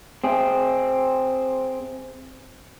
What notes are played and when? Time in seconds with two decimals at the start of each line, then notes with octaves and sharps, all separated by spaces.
0.24 C4 G#4